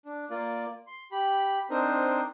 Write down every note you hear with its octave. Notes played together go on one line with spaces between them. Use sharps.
D4
A#3 F4 D5
C6
G4 B5
C4 D4 D#4 A#4 C5